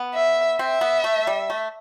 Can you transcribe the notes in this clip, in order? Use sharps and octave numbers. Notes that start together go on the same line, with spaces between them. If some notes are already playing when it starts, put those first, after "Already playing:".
Already playing: B3
E5
C4 E5
B3
A3
G3
A3